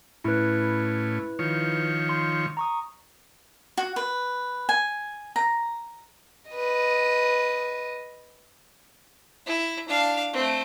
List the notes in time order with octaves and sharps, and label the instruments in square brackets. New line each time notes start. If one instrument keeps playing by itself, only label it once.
[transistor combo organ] A2 C#4 [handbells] E4 B4
[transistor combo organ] D#3 F3 C#5
[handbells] C6
A#5 C#6 D#6
[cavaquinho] F#4
B4
G#5
A#5
[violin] B4 D#5
[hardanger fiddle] E4
D4 F5
A3 C4